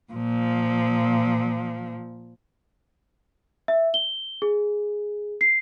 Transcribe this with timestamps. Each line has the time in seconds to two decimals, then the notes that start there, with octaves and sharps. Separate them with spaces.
0.13 A#2 F3
3.68 E5
3.94 G7
4.42 G#4
5.41 C7